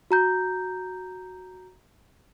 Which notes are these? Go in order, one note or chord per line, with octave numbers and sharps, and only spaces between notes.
F#4 A#5 G6